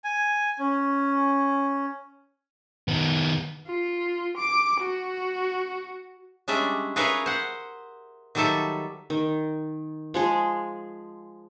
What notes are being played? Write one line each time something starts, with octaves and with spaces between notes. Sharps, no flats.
G#5
C#4
D#3 B3
F4
D6
F#4
G3 G#3 C#4 D4 E5
F4 G#4 A#4 B4 C#5 E5
C5 F#5
D#3 F#3 G3 A4 E5 A5
D#3
F3 G#3 G#4